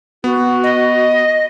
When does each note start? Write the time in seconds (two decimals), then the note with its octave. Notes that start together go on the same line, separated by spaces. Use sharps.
0.24 B3 F#4
0.63 D#5